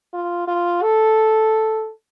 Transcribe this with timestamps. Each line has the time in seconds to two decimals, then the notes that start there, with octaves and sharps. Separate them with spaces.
0.13 F4
0.47 F4
0.82 A4